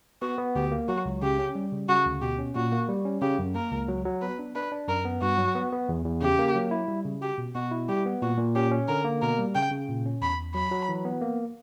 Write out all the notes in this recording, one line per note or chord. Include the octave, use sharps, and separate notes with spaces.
B3 F#4
B3
D2 G4
A#3
F#3 F#4
C#2
C#3 G4
C#4
G3
C#3
C#3 F#4
D2
B2 G4
C#4
A#2 F#4
A#3
G3
C#4
C#3 G4
F#2
A#3 A#4
C#2
F#3
F#3
B3 B4
D4
D4 B4
D4
F#2 A#4
B3
G2 F#4
F#3
B3
B3
E2
E2
C#3 G4
A#3
F#3
E4
G3
C#3
F#4 G4
B2
B2 F#4
E4
G3 G4
B3
A#2 F#4
A#2
C#4 G4
C#4
D3 A#4
A#3
B2 A#4
G3
C#3 G5
C#3
A#2
C#4
E2 B5
E2
F#3 B5
F#3
E3
B3
A#3